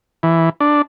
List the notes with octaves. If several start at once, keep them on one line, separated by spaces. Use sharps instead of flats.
E3
D4